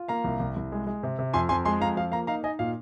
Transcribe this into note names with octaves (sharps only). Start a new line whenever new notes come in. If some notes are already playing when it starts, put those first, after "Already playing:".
Already playing: F4
A#3 F5 A#5
C2
C2
C2
G#3
G#3
C3
C3
F2 G#5 C6
F2 G#5 C6
G#3 G#5 C6
F2 F5 A#5
F3 F5
A#3 F5 A#5
D#4 F5 A#5
D#4 D#5 G#5
A#2 F5